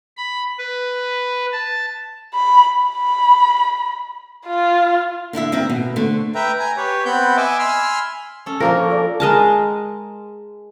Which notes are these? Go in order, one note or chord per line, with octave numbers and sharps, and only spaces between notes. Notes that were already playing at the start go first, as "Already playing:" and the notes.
B5
B4
A5
B5
B5
F4
D3 D4 E4 E5
D#3 C4 E5
B2
D3 A3 C5
B4 E5 G5 A#5
G#5 A#5
G4 B4 C#5
B3 C4 F#5 B5 G6
D#5 E5 G#5 D6 E6
G#5 B5 C6 E6 F6
C#4 A4
F3 A#3 D4 F4 A#4 F5 G#5
A4 C#5
A4 D5 D6
G#3 A#4 A5